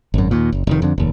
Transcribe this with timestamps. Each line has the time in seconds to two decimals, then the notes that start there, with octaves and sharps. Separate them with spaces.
0.14 G#1 F#2
0.31 D#2 A#2
0.52 F#1
0.67 F1 D#3
0.82 F2 D3
0.98 F1 D#2